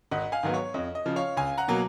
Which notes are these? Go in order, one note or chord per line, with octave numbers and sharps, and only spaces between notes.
G#1 D#5 F#5
F5 G#5
G#2 D#3 F#3 B3
C#5
F2 D#5
D#5
C#3 F3
C#5 F5
C#2 F5 G#5
F#5 A#5
B2 F#3 A#3